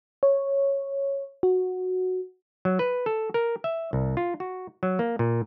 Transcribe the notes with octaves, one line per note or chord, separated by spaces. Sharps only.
C#5
F#4
F#3
B4
A4
A#4
E5
C2
F4
F#4
F#3
A#3
A#2